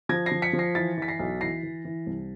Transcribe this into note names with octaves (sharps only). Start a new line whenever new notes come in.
F3 G#6 A#6
A#6 C7
F3
B6 C#7
F3
A#6 C7
E3 A6 B6
E3 B6
A#6 C7
B1
E3 A#6 C7
E3
E3
C2